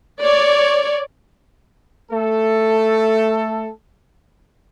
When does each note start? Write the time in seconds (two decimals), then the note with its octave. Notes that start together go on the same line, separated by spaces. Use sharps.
0.21 C#5 D5
2.10 A3 A4